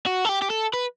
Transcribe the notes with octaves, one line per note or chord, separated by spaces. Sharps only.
F#4
A4
G4
G4
A4
B4